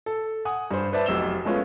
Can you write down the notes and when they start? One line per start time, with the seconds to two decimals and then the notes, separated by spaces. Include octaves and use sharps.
0.06 A4
0.45 F#5 G#5 D#6
0.71 G2 C5
0.93 B4 C5 D5 E5 A5
1.06 F1 B1 E6 E7 G7
1.45 G#3 A3 B3 C#4 F4